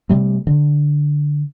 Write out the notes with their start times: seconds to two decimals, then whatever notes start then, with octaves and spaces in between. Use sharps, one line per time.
0.09 C3 G3 A3
0.47 D3